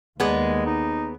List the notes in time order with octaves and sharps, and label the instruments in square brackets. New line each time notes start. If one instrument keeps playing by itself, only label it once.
[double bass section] D#2 [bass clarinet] G#3 [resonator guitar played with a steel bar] B3 G#4 D5
[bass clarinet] D#4